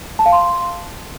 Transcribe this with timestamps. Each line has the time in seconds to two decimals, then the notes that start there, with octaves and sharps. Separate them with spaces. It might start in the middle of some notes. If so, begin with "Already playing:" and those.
0.19 A5
0.26 F5
0.32 C6